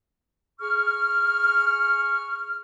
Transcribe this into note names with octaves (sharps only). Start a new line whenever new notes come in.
G#4 C#6 F6